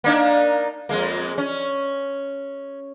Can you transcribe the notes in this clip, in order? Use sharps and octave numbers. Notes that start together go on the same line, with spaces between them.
A#3 D4 D#4
F2 G#3 A#3
C#4